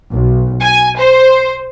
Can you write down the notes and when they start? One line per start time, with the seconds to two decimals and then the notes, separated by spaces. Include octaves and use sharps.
0.11 B1
0.62 G#5
0.98 C5